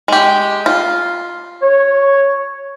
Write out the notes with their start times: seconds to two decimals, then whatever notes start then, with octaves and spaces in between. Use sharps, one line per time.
0.08 G#3 G4
0.66 F4
1.62 C#5